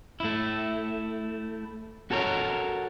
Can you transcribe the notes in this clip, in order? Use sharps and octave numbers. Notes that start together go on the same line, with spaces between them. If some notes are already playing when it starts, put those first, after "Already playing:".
A3 E4
F#4 A4 A#4 C#5